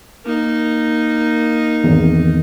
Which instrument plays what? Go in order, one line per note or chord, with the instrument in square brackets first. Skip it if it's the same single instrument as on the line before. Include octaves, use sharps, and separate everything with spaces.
[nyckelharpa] A#3 D#4
[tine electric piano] G#1 E2